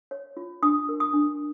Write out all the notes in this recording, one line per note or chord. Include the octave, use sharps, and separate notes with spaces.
C#5
F4
D4 D#6
A#4
D#6
D4